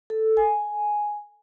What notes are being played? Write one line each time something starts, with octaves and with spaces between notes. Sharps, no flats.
A4
G#5